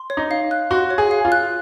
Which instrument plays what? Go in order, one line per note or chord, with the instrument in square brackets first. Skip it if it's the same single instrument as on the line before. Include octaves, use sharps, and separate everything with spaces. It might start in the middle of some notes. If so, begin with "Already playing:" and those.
Already playing: [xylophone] C6
C#5
[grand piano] D#4
[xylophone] F5
F#6
[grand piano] F#4 [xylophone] C6
[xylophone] C#5
[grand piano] G#4
[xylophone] F5
[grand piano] F4
[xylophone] F#6